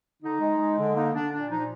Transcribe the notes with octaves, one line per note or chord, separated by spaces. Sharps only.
D3 D#4
G#3
G#3
D3
A#3 D#4
D3 D4
A#2 D4
F3 D#4